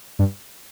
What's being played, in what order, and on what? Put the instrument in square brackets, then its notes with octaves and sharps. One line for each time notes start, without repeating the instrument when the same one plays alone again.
[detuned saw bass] G2